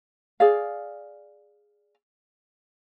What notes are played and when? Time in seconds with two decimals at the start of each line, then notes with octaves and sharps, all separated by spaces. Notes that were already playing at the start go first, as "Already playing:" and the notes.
0.40 G#4 D5 F5